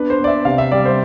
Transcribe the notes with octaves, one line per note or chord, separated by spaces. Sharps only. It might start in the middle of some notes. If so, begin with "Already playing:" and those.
Already playing: B3 D4 B4
C5
B3 D5
E5
C3 F5
E5
G3 D5
C5